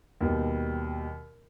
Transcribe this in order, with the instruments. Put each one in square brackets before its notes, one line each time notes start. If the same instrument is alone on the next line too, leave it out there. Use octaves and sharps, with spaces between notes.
[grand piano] D#2 B2 G3